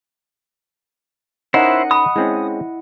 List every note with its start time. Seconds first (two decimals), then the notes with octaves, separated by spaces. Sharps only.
1.54 C#4 D#4 E4 A#4 C5 D#5 F#5
1.91 B5 D#6
2.16 G#3 C4 C#4 E4